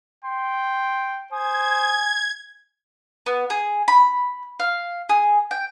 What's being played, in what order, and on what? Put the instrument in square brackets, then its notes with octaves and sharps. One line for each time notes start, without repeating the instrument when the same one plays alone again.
[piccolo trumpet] G5 [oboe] C6
[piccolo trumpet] C5 [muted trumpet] G#5 [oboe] D#6 [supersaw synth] G#6
[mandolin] B3
G#4
B5
F5
G#4
G5